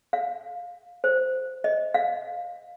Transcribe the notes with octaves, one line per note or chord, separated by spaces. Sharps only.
F5
C5
D#5
F5